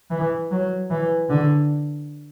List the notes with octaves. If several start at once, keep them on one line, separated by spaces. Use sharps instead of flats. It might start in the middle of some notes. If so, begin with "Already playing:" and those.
E3
F#3
E3
D3